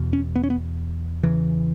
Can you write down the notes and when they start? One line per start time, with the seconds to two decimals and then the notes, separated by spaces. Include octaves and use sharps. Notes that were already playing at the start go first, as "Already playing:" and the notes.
Already playing: E2 B2
0.13 C#4
0.36 B3
0.44 C#4
0.50 B3
1.23 E2 C#3 E3